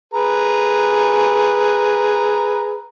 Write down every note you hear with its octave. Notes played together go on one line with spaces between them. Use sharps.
G#4 B4 A#5